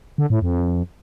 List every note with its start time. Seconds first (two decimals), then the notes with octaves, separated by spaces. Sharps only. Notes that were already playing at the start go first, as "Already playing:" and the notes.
0.18 D3
0.30 A2
0.42 F2